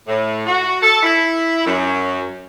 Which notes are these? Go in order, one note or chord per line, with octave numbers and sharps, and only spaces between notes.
A2
F#4
A4
E4
F#2